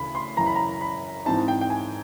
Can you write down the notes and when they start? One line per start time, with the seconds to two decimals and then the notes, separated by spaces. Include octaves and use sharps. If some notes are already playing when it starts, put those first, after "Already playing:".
Already playing: D2 C#3 E3 A3 B5
0.15 C6
0.37 F#2 C#3 E3 A#5
0.47 B5
0.56 A#5
0.81 B5
1.25 G#2 E3 G#3 C4 D#4 A5
1.48 G5
1.61 G5
1.70 G#5